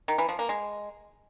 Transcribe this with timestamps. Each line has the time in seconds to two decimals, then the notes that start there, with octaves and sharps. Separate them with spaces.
0.08 D#3
0.18 E3
0.29 F3
0.39 A#3
0.49 G#3